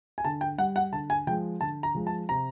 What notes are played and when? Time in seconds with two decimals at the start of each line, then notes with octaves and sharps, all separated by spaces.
0.18 G#5
0.25 D3 A5
0.41 G5
0.58 G3 F#5
0.76 F#5
0.92 D3 A5
1.10 G#5
1.27 F3 G#3 G5
1.61 D3 A5
1.83 A#5
1.95 F3 G#3
2.07 A5
2.29 C3 A#5